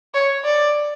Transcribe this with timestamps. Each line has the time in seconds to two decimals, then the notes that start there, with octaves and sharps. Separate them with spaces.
0.14 C#5
0.45 D5